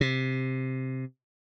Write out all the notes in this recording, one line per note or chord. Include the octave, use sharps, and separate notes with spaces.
C3